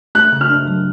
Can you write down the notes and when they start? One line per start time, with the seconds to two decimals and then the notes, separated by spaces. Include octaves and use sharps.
0.15 A3 F#6
0.32 C#3
0.41 F6
0.50 D4
0.67 F#3